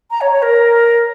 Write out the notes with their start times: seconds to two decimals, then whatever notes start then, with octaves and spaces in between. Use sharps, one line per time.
0.11 A#5
0.21 C#5
0.31 C#5
0.42 A#4